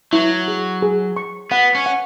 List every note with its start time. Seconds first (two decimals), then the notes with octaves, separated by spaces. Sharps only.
0.13 F#3 E4
0.48 G#4
0.82 G#4
1.17 C#6
1.51 B3 F#5
1.75 C#4
1.86 F#5